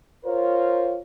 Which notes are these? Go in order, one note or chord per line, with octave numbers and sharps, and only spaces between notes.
F4 A#4 C5 C#5